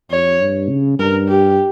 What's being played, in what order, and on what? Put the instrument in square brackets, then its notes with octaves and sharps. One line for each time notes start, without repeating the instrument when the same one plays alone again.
[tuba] F2 [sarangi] C#5
[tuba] G2
C#3
[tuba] G2 [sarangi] A#4
[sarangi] G4